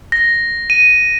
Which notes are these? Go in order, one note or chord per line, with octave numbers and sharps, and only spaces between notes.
A#6
D#7